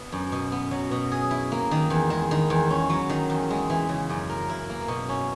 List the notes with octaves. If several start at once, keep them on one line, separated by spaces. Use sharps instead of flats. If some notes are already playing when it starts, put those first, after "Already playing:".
Already playing: B3
F#2
B2
B3
F#3
B2
G#4
E4
A#3
D#3
E2
G#3
D#3
E2
C#4
F#3
D#3
E2
G#3
E3
C#3
F#2
A#4
E4
A#3
B2
C#4